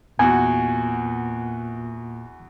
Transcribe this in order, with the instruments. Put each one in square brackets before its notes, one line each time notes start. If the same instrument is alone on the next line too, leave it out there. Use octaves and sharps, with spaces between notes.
[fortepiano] E2 F#4 [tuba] A#2 [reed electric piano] G#5